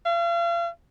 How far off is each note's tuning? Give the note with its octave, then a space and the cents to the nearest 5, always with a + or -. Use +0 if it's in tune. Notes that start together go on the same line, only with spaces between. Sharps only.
F5 -40